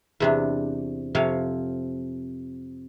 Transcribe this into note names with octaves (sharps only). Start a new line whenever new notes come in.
E2 C3 D4
F2 C3 F3 C#5 F5